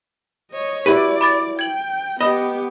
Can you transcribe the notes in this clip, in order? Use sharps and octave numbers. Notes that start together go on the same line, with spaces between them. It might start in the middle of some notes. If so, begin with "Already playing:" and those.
C#5 D#5
E4 F#4 G4 B4 D5
B5 D6 A6
G5 G#6 F#7
B3 G4 D#5 B5